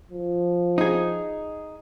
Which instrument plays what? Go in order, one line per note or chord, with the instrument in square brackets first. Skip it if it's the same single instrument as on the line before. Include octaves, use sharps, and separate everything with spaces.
[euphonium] F3
[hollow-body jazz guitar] D#4 G#4